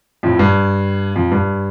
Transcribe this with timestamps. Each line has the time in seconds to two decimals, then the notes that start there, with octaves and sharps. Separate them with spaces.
0.23 F2 A2
0.39 G2
1.16 F2
1.31 G2